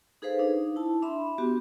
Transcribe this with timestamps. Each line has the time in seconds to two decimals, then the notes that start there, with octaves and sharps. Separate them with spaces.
0.22 D#4 G#4 A4 B4 C5 F5
0.39 D4 D#4
0.76 E4 A5
1.02 D4 E5 B5 C6
1.38 B3 F#4 G4